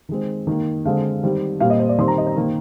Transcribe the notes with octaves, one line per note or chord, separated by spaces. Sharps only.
D#3 G#3 C4
D#3 A#3
D3 G#3 C4 F5
D#3 G3 C4
A#2 G3 C4 F5
D#5
C5
D5
D#3 G3 C4 C6
A#5
D#5
C5
D#3 A#3